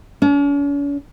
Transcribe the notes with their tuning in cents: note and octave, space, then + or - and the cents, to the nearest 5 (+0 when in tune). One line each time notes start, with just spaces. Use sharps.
C#4 +45